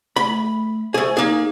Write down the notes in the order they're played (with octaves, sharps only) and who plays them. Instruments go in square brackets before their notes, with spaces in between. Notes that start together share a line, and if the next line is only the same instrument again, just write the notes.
[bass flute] A3 [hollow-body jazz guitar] B5
[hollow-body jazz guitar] A3 G#4 [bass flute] C5
[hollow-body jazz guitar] A#3 G#4 [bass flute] D#4